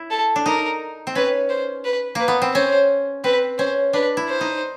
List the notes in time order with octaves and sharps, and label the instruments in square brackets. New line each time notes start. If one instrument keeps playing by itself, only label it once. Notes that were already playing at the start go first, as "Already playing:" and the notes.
Already playing: [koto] E4
[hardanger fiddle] A4
[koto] D4
[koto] D#4 [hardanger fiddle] A#4
[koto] C4
[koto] C#4 [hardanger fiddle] B4
[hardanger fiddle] C5
B4
[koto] A#3 [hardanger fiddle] B4
[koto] B3
C4
[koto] C#4 [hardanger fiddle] C5
[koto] C4 [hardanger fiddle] B4
[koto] C#4 [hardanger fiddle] C5
[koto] D4 [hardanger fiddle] B4
[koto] E4
[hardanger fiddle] C5
[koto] D#4